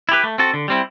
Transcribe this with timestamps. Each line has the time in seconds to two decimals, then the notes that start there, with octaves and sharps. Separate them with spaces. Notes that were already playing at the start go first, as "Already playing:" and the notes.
0.09 E4 G4 B4
0.24 A3
0.38 C4 F#4 A4
0.54 D3
0.68 G3 C4 E4